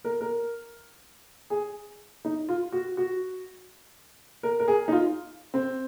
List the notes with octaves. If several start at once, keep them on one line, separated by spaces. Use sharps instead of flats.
A#4
A#4
G#4
D#4
F4
F#4
F#4
A#4
A#4
G#4
D#4
F4
C4